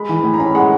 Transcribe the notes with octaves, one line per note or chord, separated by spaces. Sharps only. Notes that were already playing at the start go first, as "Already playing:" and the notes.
Already playing: G#3 B5
E3
B5
A2
A#5
C#4 B5
G#3 F#5